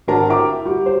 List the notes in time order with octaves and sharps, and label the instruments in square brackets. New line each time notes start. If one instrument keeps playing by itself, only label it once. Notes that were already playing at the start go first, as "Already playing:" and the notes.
[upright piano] G#1 D4 F#4 A#4 A5 A#5
E4 A#4 E5 G5 A#5 D6
G3 F#4
C5